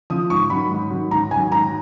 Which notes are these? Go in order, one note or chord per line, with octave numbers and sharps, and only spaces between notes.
F3 D#6
G#2 C#6
D#3 F#3 B5
G#2
D#3 F#3
G#2 A#5
D#3 F#3 G#5
G#2 A#5